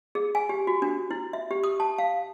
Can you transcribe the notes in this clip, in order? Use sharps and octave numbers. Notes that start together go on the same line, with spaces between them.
G#4
G#5
G4
F#4
D4
E4
E5
G4
D#6
A5
F5